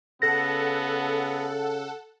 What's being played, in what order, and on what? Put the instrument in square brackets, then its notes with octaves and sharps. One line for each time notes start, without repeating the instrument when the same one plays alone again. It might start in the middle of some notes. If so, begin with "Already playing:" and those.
[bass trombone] C#3 [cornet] B3 [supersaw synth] A4 F#5 [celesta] A#6